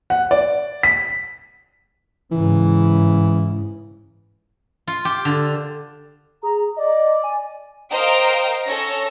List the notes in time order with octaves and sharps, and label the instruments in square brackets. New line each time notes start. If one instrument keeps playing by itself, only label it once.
[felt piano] F#5
D5
B6
[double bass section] G#2 C#3 [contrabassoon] E3
[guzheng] F4
G4
D3
[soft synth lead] G#4 [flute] A#5
[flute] D5 [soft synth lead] D#5
[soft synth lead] G#5
[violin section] A#4 C5 D#5 F5 G5 A#5
C#4 A4 C#5 A#6